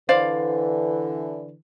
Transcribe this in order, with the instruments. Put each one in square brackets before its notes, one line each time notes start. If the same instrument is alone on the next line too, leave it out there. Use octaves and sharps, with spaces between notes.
[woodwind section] D3 E3 [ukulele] C5 D5 F5